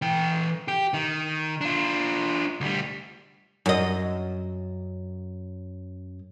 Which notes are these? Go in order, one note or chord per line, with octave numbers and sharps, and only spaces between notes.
E3 G5
G4
D#3
D4 F4
D2 G3
F#2 D#5